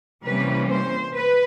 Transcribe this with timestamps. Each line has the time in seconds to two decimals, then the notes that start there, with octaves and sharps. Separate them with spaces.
0.25 C3 E3 G3 A#3 C#4 B4
0.70 C5
1.15 B4